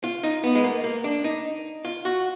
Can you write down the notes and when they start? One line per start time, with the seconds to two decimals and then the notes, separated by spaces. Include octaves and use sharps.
0.04 F4
0.23 D#4
0.44 B3
0.55 G#3
0.64 A#3
0.84 A#3
1.04 D4
1.24 D#4
1.85 F4
2.05 F#4